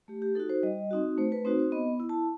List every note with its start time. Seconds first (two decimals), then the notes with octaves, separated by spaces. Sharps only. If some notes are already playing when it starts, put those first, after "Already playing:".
0.08 A3 G4
0.22 G4
0.35 D#4 F#4 A4
0.50 C5
0.63 G3 D#5
0.91 C4 D#4 F#4
1.18 A3 C5
1.32 B4
1.45 C4 D#4 F#4 C5
1.59 C5
1.72 B3 D#5
2.00 E4
2.09 A5